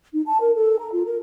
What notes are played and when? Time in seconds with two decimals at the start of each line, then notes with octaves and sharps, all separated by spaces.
0.14 D#4
0.26 A5
0.41 A#4
0.56 A4
0.79 A#5
0.92 F4
1.06 A#4